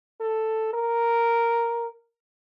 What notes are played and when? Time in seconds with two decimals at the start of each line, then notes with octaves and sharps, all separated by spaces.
0.21 A4
0.74 A#4